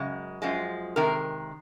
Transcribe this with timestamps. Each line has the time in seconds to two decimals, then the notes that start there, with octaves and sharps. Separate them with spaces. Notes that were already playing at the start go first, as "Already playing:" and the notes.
Already playing: F#2 C#3 G#3
0.42 F#2 F3 G#3
0.96 C3 D#3 G#3 A#4